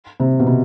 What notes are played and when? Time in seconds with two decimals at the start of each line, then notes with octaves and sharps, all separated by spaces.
0.20 C3
0.40 B2
0.47 C3